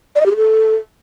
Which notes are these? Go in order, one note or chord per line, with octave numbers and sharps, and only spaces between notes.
D5
D#5
G4
G#4
A4